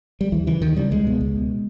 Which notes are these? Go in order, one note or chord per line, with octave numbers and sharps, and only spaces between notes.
G3
D#2 E3
C#3 E3
D#2 D#3
C#3 G3
C#2 G#3
B2
C#2
B2